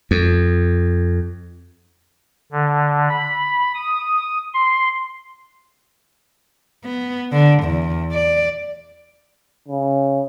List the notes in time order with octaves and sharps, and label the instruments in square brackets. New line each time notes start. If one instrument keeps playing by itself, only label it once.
[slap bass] F2
[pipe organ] D3
B5
D#6
C6
[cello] B3
D3
E2
D5
[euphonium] C#3